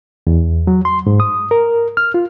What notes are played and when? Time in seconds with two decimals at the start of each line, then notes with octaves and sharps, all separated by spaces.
0.27 E2
0.67 F#3
0.85 C6
1.07 G#2
1.20 D#6
1.51 A#4
1.97 F6
2.14 F4